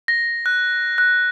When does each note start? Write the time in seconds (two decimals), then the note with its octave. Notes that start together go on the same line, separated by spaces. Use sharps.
0.08 A#6
0.46 F#6
0.98 F#6